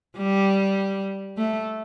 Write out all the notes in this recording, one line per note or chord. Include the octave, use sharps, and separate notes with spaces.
G3
A3